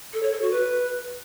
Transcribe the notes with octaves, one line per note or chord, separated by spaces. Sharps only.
A4
C#5
A4
F#4
B4